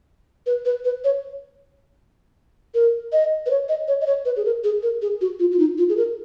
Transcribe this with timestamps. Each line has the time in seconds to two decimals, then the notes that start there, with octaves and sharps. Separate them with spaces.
0.46 B4
0.65 B4
0.85 B4
1.04 C#5
2.75 A#4
3.13 D#5
3.46 B4
3.50 C#5
3.69 D#5
3.88 C#5
4.01 D#5
4.07 C#5
4.25 B4
4.36 G#4
4.45 A#4
4.64 G#4
4.83 A#4
5.02 G#4
5.21 F#4
5.40 F4
5.51 F4
5.59 D#4
5.78 F4
5.89 G#4
5.97 A#4